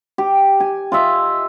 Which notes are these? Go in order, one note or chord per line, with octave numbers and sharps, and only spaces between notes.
G4
G#5
F4 D#5 E5